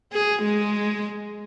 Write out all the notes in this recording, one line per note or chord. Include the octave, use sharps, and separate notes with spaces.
G#4
G#3